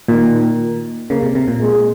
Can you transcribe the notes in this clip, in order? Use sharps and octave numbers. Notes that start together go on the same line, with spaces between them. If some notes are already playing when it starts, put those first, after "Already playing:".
A#2 D#3
C#3 A#3
C3
C3
A#2
G#3